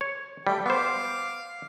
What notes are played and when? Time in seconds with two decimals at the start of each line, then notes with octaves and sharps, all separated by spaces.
0.01 C#5
0.47 G3 A3 G5
0.66 B3 C5 F5 D6